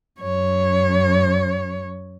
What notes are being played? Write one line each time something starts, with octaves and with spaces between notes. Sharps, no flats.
F#2 C#5